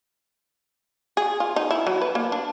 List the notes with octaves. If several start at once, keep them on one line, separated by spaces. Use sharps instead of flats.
G#4
F4
D#4
E4
F#3
B4
A#3
D4